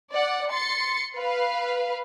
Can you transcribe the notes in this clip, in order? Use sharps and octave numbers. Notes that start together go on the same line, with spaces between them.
D5 F#5
C6 A6 C#7
B4 F5